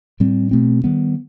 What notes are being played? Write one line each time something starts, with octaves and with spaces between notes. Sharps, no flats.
A2 G3 C4
B2 A3 C4
D#3 G3 B3